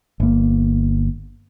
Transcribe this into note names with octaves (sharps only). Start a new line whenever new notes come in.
G1 A#3